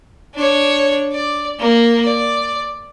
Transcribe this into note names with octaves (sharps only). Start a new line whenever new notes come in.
D4 C#5
D5
A#3
D5